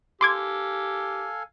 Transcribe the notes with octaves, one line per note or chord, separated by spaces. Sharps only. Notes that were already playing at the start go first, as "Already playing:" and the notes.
G4 A4 F5 G#5 C6 D6 G#6